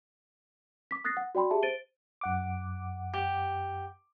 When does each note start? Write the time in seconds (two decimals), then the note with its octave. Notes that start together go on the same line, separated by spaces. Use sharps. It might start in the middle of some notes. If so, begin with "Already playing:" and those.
0.91 D6 B6
1.04 D#6 F#6 A6 A#6 C7
1.17 F#5
1.35 F#4 D5 G5 B5 C6
1.51 G4 G#4 E5 A5
1.63 C5 A6 D7 D#7 G7
2.21 F#2 F#5 D6
3.14 G4